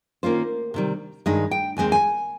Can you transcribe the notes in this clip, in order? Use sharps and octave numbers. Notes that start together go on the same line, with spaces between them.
D#3 A#3 C#4 F4 C5
C3 D#3 G3
G2 D#3 G#3 D#4 D#5
G5
D#2 C#3 G#3 C4 G#5
G#5